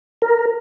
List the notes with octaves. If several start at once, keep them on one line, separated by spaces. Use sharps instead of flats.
A#4